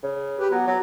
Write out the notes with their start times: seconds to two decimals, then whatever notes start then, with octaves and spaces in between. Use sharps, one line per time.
0.03 C#3
0.39 G4 B4
0.51 F#3 B3
0.67 F#3